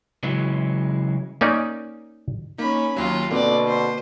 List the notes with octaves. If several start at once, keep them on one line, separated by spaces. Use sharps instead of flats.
C#3 E3 F#3 G#3 E4
A#3 C#4 D#4 D5
A#3 C#4 D#4 B5
D#2 F#3 F4
B2 D3 A#3 C4 D5
C5